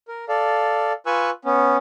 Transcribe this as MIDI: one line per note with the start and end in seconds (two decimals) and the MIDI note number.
0.08 0.25 70
0.29 0.93 69
0.29 0.93 74
0.29 0.93 77
1.06 1.30 65
1.06 1.30 71
1.06 1.30 80
1.06 1.30 85
1.06 1.30 88
1.06 1.30 90
1.45 1.77 59
1.45 1.77 61